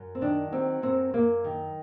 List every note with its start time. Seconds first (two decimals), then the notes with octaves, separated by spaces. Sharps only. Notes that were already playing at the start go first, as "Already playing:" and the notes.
Already playing: F#2
0.15 C4
0.21 D#3 D4
0.52 F#3 C4
0.82 F#2 C4
1.14 F#2 A#3
1.44 D#3